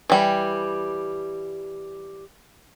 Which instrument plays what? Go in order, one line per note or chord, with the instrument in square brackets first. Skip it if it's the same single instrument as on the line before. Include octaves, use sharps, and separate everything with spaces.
[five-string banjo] E3 G3